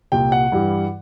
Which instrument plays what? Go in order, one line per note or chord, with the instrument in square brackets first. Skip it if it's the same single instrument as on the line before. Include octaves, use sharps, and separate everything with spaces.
[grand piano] C2 A#2 G3 G5
F#5
G2 E3 G3